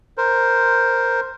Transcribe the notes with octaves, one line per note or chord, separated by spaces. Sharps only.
A#4 C5